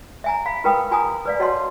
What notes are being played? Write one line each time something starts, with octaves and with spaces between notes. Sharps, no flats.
E5 G#5 A#5
F5 B5
E4 A#4 B4 G5 B5 D#6
F4 G#5 A#5 D#6
B4 D5 F5
F#4 C#5 D#5 F#5 A5 C6